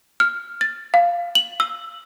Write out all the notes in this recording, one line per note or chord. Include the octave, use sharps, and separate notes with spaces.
F6
A6
F5
F#7
E6